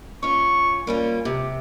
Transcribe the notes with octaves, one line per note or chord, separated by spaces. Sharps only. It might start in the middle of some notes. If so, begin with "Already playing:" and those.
C#4 F4 C#6
G3 A#3 C#4 F4
C3 G4